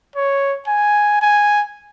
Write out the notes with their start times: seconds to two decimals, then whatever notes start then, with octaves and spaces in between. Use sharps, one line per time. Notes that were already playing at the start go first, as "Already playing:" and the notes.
0.16 C#5
0.67 G#5
1.22 G#5